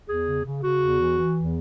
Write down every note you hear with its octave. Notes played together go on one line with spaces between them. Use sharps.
E2 G#4
C#3
C#3
C#3 F#4
E2
E3
E3
E2